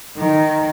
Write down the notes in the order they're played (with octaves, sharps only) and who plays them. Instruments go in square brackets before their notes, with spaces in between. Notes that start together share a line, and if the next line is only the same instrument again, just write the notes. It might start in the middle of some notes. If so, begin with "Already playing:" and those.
[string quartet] D#3